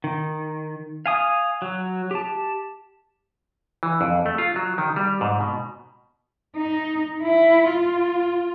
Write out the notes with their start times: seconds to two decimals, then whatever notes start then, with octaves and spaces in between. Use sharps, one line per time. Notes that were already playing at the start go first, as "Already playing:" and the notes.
0.04 D#3
1.06 F5 G#5 D#6
1.62 F#3
2.11 G4 A5
3.83 E3
4.01 F2
4.26 A3
4.38 F4
4.56 F#3
4.78 D#3
4.96 G3
5.21 G#2
5.41 B2
6.56 D#4
7.22 E4
7.69 F4